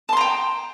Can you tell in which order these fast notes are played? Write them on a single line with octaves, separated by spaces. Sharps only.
A5 C6 A#5 G5